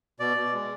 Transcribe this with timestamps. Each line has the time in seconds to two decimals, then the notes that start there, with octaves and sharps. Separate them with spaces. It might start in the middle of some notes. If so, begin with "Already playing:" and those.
0.20 B2 D5
0.37 B2
0.53 G#3